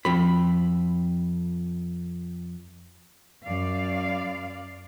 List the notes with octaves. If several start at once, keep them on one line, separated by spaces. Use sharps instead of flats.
F2 B5
F#2 D5 F5